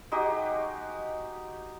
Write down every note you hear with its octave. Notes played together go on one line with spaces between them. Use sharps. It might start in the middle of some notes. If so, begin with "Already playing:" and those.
G#3 D#4 F#4 G4